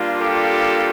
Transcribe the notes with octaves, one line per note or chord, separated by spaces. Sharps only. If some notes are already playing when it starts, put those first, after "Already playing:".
Already playing: G3 A#3 D4 F4
G4 A4